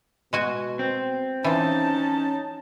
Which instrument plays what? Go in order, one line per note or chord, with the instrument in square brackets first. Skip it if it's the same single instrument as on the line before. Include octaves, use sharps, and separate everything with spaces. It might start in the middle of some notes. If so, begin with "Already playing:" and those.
[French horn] B2 [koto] G#3 F#4 G#5
[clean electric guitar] C4
[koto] E3 F4 [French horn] C#4 [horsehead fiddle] D#4 A5